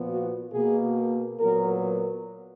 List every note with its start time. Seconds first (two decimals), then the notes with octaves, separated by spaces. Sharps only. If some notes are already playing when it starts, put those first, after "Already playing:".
Already playing: A#2 F3 B3
0.10 F#4
0.53 B2 A#3 G#4
1.40 A#2 F#3 B3 A#4